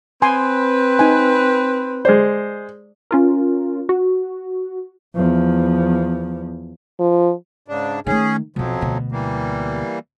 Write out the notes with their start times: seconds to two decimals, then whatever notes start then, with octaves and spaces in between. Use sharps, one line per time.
0.22 C4 B4 G#5 C6
0.99 D#4 G#5
2.05 G#3 C5 D5
3.11 C#4 F4 A#4
3.89 F#4
5.15 E2 F3
6.99 F3
7.68 G#2 C#3 D4
8.07 D#3 A3 C#4 G#4
8.56 B1 F2 F3 F#3 B3
8.81 D2 B2
9.12 E3 G3 A#3